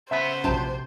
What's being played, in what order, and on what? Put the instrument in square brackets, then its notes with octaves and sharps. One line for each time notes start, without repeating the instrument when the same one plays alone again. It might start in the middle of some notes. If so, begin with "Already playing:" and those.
[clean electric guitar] C#3 B3 B4 [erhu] C5 [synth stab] E5
[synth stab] A#1 F#2 [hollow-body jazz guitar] C3 A5